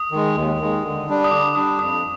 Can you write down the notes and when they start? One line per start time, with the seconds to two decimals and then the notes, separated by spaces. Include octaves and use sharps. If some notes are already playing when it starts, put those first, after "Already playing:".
Already playing: D#6
0.12 D#3 G#3
0.35 D#2
0.59 D#3 G#3
0.84 D3
1.08 G3 D4
1.24 D#6
1.31 D3 D6
1.55 G3 D4 D#6
1.79 F2 D#6